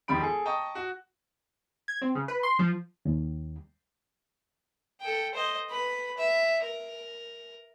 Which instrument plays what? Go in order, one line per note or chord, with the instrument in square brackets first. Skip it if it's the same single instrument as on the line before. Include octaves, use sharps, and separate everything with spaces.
[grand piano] E1 D#3 F3 G4 B5 D7
G#4 A4
D#5 G5 A5 A#5 C#6 D#6
F#4
[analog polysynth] G#6
C4
C#3
B4
C6
F3
[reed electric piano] D#2
[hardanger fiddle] A4 G5
C5 D#5
B4 B5
E5
A#4